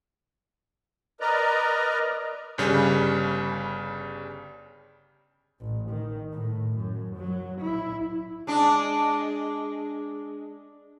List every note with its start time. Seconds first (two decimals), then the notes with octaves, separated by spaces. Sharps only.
1.20 A#4 B4 D5 D#5 A#5
2.58 G1 C#3 G3
5.60 A1
5.89 D#3
6.32 A2
6.77 F#2
7.17 F#3
7.61 E4
8.47 G#3 D4